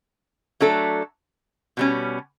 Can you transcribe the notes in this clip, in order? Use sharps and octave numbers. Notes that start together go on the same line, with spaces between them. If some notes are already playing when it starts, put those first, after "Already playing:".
F#3 A3 D4 A4
B2 G3 C#4